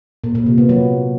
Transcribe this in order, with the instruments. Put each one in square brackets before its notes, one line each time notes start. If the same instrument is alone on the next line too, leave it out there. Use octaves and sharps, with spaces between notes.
[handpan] A#2
A#2
C3
B3
F#3